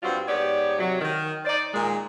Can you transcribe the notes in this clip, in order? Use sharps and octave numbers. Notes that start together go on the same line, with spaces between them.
G2 G3 C4 F4 F#4
G#2 B3 G4 C#5 D5
C3 F#3
D#3
D#4 C5 D5
A#2 D#3 G#3